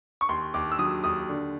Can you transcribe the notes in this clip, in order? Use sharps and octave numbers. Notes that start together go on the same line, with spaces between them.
C#6
D#2 C6
D#2 D6
E6
F#3 D#6
D#2 D#6
D3